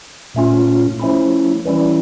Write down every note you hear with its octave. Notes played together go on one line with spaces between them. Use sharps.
A#2 A3 C#4 F4
F3 A3 C#4 E4
E3 G3 C#4 E4